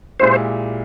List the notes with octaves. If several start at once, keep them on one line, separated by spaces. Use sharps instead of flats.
A#2 G#3 E4 G4 C5